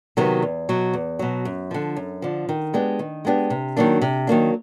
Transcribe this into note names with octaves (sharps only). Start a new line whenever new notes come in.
C3 D#3 F#3 B3
E2
B2 F#3
E2
B2 F#3
F#2
D3 F3
F#2
D3 F3
D#3
G#3 B3 D4 G4
D#3
G#3 B3 D4 G4
C3
D#3 F#3 A#3 D4
C3
D#3 F#3 A#3 D4